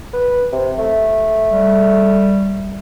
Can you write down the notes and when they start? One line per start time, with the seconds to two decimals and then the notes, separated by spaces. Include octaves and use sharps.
0.13 B4
0.52 C3
0.78 A3
1.52 G3